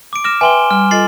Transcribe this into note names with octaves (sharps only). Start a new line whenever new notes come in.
D6 D7
D6 F6 A#6 E7
B4 E5 G5 G#5 C6 G7
G3 F6
F4 A4 D#5 A6 C7 F#7